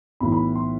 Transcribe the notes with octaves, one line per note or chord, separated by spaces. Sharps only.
B1 A2 E3 B5
B5
C6